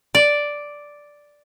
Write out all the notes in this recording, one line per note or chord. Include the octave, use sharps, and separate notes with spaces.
D5